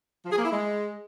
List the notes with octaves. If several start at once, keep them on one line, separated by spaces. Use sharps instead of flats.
F3
G#4
A#3
E4
G#3